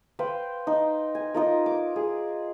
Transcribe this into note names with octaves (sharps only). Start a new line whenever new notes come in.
B4 C5 F5 G5
D#4
G#5
D#4 F4 A#4
D6
G#4